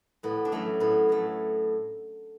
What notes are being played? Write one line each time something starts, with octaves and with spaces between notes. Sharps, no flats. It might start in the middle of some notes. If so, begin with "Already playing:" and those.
A2 B3
D4
F#3 A3 C#4
A2 B3
F#3 A3